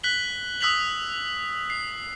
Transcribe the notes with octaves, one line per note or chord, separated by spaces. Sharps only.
F#6 B6 F#7 G7
D#6 E6 F#6 B6 F7 F#7
C7